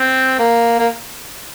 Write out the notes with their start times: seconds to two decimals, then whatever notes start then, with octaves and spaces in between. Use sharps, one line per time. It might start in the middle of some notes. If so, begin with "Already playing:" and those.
Already playing: C4
0.39 A#3
0.79 A#3